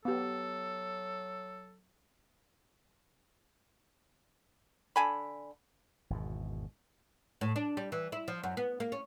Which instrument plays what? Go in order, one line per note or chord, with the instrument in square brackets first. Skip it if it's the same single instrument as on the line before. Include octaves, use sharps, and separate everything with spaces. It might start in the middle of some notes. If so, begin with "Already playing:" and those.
[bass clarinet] F#3 [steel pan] B3 G4 [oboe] A4
[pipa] D3 G#5 B5
[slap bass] G#1 E2 B2
[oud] A2
D4
G3
E3
E4
F3
F#2
B3
A#3
C#4